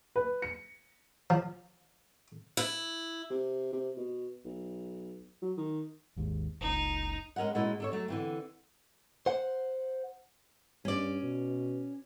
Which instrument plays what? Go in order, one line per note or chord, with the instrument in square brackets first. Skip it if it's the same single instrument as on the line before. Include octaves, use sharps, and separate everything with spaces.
[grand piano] B4
C#7
[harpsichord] F3
[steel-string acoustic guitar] E4
[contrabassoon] C3
C3
B2
B1
F#3
D#3
[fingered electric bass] G#1 D#2 G#2
[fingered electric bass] F#1 C#2 [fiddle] D#4
[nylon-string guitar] G#3 C#4 A#4 D#5 F#5
A#2 G#3 C#4 E4 F#4
D4 A4 C#5
F#3 A3
D3 E3 C4
[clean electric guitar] C5 F#5
[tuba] G2 [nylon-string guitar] C#4 D5
[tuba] B2